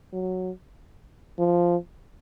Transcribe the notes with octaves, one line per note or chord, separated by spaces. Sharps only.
F#3
F3